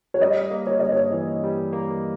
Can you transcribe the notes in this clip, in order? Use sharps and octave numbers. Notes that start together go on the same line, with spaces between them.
C#5
G3 D#5
A#3
C#5
G2 D#5
C#5
E3
G3
A#3